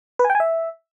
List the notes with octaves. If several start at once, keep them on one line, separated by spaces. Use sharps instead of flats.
B4
G#5
G5
G#5
E5